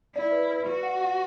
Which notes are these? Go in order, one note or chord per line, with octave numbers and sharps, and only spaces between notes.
E4 D5
B4
B4
F#4 B4
F#5
F#5